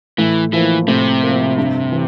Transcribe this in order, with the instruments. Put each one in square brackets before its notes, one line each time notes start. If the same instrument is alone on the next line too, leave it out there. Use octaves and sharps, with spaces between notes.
[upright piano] A2 [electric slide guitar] E3
[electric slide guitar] E3 [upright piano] F3 A#3
[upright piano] A2 [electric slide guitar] C3
[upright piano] F3 A#3
G2
E3